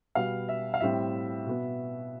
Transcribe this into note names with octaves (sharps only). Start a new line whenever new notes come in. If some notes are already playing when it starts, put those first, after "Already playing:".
B2 G3 B3 F5
E5
F5
A2 G3 C4 E5
B2 B3